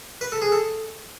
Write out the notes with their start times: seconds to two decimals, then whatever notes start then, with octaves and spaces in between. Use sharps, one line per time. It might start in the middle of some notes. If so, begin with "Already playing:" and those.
0.21 B4
0.32 A4
0.42 G#4
0.52 A4